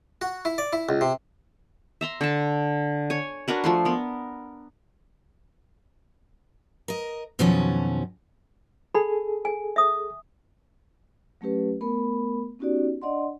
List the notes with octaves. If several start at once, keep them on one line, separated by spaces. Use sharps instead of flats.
F#4
E4
D5
E4
C#2
C3
E5 A#5 C6
D3 A5
C#5 G#5
D4 F#4 A#4 B4
F3 A3 C6
B3 A#4
A#4 D#5
F2 B2 D#3 F3 F#3 C#4
G#4 A4 B5
G#5
E5 D#6
F#3 A3 C#4 G4 B4
A3 B3 A#4 B5
B3 C#4 D#4 F#4 G4 D5
D4 D5 D#5 F#5 C6